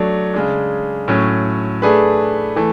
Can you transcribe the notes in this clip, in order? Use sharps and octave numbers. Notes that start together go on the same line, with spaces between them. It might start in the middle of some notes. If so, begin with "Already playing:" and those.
Already playing: F#3 A3 D4
C#3 G#3 D4
A2 F#3 C#4
A3 D4 G#4 B4
E3 A3